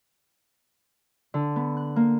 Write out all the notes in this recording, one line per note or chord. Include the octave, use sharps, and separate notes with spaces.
D3
B3
F#6
A#3